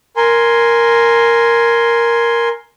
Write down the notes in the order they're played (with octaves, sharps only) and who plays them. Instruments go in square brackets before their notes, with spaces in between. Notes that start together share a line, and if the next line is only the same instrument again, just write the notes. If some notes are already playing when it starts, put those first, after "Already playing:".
[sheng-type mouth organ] A#4 G#5 C6